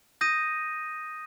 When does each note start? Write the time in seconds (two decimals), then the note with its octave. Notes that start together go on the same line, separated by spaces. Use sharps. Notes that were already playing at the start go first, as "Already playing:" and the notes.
0.21 D#6 G6 A#6 D#7